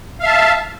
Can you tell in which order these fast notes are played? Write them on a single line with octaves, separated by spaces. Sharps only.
F5 E5 A5